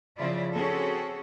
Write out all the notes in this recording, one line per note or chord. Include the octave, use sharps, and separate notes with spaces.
C#3 F3 E4 F4 D5 E5
C4 C#4 F#4 G#4 A4